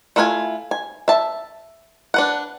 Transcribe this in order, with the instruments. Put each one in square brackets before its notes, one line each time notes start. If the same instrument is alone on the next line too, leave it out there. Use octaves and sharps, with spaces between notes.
[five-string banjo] A3 E4 F4 B4 G#5
G#5
E5 A5
D4 B4 F#5